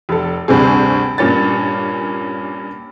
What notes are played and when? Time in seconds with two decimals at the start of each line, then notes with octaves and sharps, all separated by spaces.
0.09 F1 A4
0.48 D2 G2 C3 C4 G#4
1.18 G2 A#2 C#4 A6